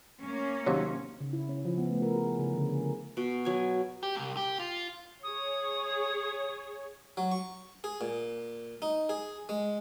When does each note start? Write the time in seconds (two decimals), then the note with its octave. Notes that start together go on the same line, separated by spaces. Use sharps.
0.23 A#3 C#4
0.66 D#2 C3 F#3
1.21 C#3
1.33 E4
1.49 C#4
1.65 F3
1.78 B3
1.89 A3
2.02 A#4
2.16 G#4
2.39 C#3
2.54 D3
2.66 G#4
2.78 A#4
3.17 B2
3.45 F#3 G#5
4.03 G4
4.15 C2
4.37 G4
4.60 F4
5.23 G#4 C#5 D#6
7.17 F#3
7.31 C#6
7.84 G#4
8.01 A#2
8.82 D#4
9.09 G#4
9.49 G#3